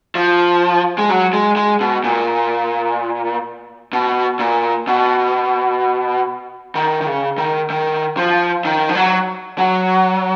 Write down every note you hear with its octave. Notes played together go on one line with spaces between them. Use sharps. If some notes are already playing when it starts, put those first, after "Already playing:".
F3
G#3
F#3
G#3
G#3
B2
A#2
B2
A#2
B2
D#3
D#3
C#3
D#3
D#3
F3
D#3
F3
F#3
F#3